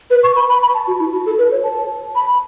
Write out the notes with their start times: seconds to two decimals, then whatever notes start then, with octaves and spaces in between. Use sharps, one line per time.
0.10 B4
0.23 C#6
0.36 B5
0.49 B5
0.62 B5
0.74 A5
0.87 F#4
1.00 E4
1.12 F#4
1.26 A4
1.38 B4
1.51 C#5
1.64 A5
2.15 B5